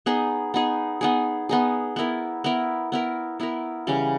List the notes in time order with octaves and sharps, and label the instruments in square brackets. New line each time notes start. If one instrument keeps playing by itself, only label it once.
[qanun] B3 D#4 G#4
B3 D#4 G#4
B3 D#4 G#4
B3 D#4 G#4
B3 E4 A#4
B3 E4 A#4
B3 E4 A#4
B3 E4 A#4
C#3 E3 G3 C#4